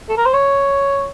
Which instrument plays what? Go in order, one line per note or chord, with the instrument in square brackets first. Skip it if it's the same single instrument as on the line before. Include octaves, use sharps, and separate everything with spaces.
[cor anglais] A4
A#4
C5
C#5